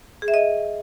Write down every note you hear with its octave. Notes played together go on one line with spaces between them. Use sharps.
G#4
E5
D#5